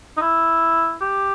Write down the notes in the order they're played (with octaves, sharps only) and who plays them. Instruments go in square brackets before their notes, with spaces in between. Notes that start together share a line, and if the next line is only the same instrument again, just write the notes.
[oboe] D#4
E4
G4